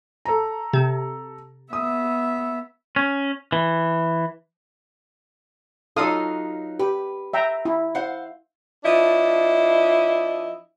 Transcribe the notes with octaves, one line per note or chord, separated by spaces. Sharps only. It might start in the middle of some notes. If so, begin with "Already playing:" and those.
A4 A#5
C3
B3 E5 D#6
C#4
E3
F#3 D#4 F4 A4 F5 D#6
G4 B4
E5 G5 A#5
E4
C5 F5 F#5
F3 D4 E4 D#5